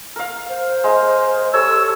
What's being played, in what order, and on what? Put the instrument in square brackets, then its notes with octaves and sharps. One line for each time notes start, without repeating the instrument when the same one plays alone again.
[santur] A#4 F5
[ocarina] C5
[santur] G#3 A#4
[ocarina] G4 [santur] A4 C#5 [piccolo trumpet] E6